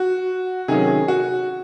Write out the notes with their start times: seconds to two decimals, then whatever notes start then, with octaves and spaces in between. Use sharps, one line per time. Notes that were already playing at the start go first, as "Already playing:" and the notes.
Already playing: F#4
0.68 C3 D#3 F#3 A3 C#4 G#4
1.08 F#4